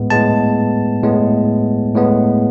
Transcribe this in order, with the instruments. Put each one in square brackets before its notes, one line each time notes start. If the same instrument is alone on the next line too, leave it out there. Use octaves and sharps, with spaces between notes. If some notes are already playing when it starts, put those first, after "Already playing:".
Already playing: [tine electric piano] A2 G#3 B3
A2 G#3 B3 A5
A2 G#3 B3
A2 G#3 B3